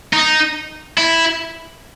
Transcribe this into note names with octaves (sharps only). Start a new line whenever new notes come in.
D#4
E4